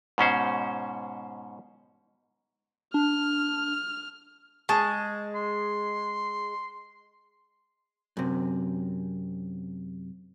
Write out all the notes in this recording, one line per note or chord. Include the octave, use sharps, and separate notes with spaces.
G#2 B2 C#4 C5
D4 F6
G#3 G#4 A5 C#6
C6
F#2 C3